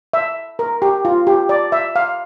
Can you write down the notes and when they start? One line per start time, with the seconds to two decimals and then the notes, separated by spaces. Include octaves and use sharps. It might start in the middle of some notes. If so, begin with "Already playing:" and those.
0.13 E5
0.59 A#4
0.82 G4
1.05 F4
1.27 G4
1.49 D5
1.72 E5
1.96 F5